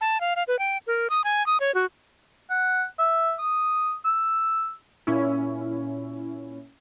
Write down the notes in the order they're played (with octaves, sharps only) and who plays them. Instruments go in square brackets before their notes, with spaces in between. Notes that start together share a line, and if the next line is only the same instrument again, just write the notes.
[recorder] A5
F5
F5
B4
G5
A#4
D#6
G#5
D#6
C#5
F#4
[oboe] F#5
E5
D#6
E6
[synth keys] A#2 C#4 E4